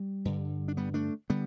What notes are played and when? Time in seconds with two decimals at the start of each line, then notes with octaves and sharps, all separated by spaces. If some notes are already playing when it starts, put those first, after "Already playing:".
Already playing: G3
0.25 G2 D3
0.68 D4
0.77 G3 B3
0.94 A3 D4
1.30 D3 G3 B3